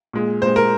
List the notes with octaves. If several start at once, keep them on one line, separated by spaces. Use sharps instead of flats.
A#2 G#3
A#2 G#3 C5
A#4